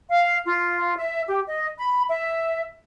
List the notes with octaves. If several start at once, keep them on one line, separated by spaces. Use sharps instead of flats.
F5
F4
E5
G4
D#5
B5
E5